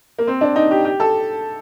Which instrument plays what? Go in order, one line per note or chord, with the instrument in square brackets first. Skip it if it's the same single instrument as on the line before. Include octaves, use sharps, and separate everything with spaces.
[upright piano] A#3
C4
D4
D#4
G4
G4
A4